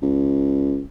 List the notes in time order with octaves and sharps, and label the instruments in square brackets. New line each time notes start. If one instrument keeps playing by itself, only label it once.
[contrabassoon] C#2